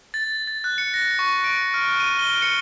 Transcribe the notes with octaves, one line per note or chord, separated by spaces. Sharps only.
A6
A6
F#6
C#7
A#6
C#6
D7
F6
D#7
G7
C#7